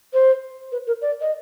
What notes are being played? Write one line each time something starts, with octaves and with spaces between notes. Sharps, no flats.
C5
B4
A#4
D5
D#5